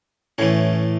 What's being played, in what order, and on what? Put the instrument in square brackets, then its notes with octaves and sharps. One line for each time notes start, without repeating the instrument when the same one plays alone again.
[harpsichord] A2 E3 A3 C#4